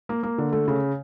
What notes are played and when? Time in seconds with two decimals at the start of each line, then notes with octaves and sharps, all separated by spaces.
0.09 A#3
0.23 A#3
0.38 D3
0.53 A3
0.68 C#3